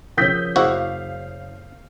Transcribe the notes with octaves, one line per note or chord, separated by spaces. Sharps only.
C#3 F3 A#4 C#5 D#6 G6 B6
F#1 E4 F#4 G#4 C5 F5